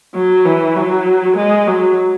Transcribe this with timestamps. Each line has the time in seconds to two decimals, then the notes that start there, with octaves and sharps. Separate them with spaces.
0.15 F#3
0.45 E3
0.76 F#3
1.36 G#3
1.67 F#3